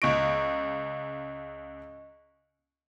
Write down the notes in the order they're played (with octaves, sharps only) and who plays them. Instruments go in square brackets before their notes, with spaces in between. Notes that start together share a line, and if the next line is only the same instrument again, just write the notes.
[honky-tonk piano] C#2 D7 [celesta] D#5 C#6 A#6